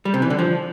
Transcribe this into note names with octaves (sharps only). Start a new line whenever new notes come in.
G3
C3
E3
D3
F3